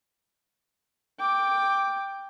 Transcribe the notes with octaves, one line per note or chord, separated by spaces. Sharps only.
G5 D6